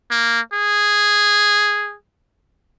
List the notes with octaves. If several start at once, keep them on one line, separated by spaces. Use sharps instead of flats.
A#3
G#4